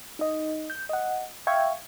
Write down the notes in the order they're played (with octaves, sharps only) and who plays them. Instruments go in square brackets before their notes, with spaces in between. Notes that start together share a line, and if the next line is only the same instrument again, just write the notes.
[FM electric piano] D#4 D#5
G6
D#5 F#5
E5 F5 G5 C#6 G#6